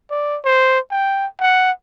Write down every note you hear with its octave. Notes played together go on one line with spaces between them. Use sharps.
D5
C5
G5
F#5